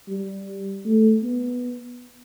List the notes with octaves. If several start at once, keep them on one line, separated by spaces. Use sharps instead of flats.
G3
A3
B3